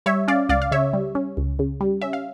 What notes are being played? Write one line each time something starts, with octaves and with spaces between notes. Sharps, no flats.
G3 C#5 E5
C#4 D5 F5
C#2 D5 F5
F5
C#3 C#5 E5
G3
C#4
C#2
C#3
G3
C#4 E5
F5